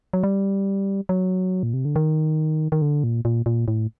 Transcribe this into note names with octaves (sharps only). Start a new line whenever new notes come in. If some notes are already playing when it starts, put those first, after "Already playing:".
F#3
G3
F#3
A#2
C3
D3
D#3
D#3
D3
A#2
A#2
A#2
A2